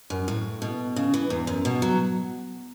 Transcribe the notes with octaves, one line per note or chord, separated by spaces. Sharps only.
F#2
A2
B2
C#3
E3
E2
F#2
B2
F#3